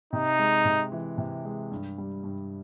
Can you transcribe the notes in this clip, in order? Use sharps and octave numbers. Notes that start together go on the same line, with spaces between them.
C3 D#4
G#3
C3
E3
C3
G#3
G2
G3
G2